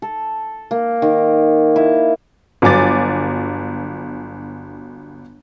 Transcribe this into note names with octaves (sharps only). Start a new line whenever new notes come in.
A4
A#3
D#3
E4
G1 F#3 G#5 D6 A6